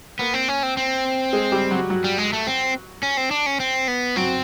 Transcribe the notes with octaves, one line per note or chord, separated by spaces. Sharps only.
A#3 B3 A#4
C4
C#4
C4
C4
G#3 G#4
G3 G4
F#3 F#4
F#3 F#4
G3
G#3
A3
C4
C#4
C4
D4
C#4
C4
B3
F#3 C4 F#4